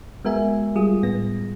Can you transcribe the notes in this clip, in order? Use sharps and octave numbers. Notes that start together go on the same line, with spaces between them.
G#3 B3 F#4 A#4 E5 G#5
G3 F4 G#4 D#6
A2 B3 A#6